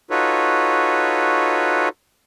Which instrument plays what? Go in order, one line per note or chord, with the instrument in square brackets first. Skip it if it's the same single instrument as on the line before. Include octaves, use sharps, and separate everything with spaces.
[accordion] D#4 F4 F#4 A4 B4 C#5